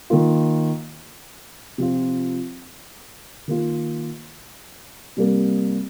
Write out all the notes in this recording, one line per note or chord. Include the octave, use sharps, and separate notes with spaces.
D#3 A#3 F4
C3 F3 C4 F4
D#3 A#3 F4
C3 G3 A#3